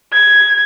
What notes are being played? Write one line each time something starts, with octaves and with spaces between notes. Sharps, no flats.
G#6